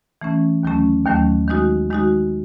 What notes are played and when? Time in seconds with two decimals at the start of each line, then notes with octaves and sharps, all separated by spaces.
0.21 E3 A3 C#4
0.63 D#2 D#3 F#3 A3 C#4
1.05 D#2 D#3 F#3 A3 C#4
1.48 D#3 G#3 D#4 F#4
1.91 D#3 G#3 D#4 F#4